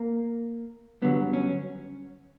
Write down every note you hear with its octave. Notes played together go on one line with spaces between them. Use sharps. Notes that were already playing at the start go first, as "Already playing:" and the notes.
Already playing: A#3
G2 D3 F#3 B3
C#4